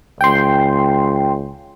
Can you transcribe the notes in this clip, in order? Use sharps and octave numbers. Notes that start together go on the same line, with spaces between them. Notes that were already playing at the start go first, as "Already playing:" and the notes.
C#2 G5 C6